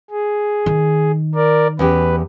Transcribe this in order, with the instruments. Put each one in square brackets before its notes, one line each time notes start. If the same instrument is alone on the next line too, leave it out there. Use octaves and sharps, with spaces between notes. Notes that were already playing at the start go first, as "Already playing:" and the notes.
[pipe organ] G#4
[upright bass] D#3
[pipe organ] A#4 D5
[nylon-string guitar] E2 C#4 G4 [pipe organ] B4